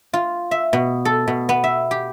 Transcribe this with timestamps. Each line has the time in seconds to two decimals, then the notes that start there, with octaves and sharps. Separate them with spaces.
0.13 F4
0.51 E5
0.73 B2
1.05 A4
1.28 B2
1.49 B3
1.64 E5
1.91 G4